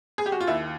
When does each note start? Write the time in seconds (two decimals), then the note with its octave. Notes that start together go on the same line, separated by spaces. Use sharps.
0.18 G#4
0.26 G4
0.32 F#4
0.41 F4
0.47 D#2 E4